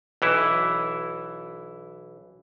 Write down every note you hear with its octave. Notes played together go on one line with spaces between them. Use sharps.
B1 E3 E4